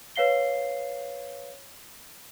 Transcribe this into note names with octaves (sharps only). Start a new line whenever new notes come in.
B4 C#5 F5 C7 G7